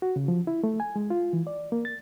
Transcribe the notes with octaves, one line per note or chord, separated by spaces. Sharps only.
F#4
C#3
F3
E4
A3
G#5
G#3
F4
E3
D5
A#3
A6